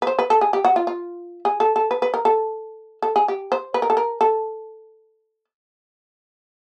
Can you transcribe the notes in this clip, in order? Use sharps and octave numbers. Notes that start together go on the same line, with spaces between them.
B4
C5
B4
A4
G#4
G4
F#4
F4
F4
G#4
A4
A4
B4
B4
A#4
A4
A4
G#4
G4
C5
B4
A#4
A4
A#4
A4